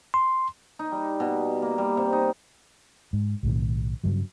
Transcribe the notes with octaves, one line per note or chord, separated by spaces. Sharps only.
C6
D#4
G3
B2
A#3
G3
C3
D#4
G#2
B1 A2 D#3
G2 C#3 F#3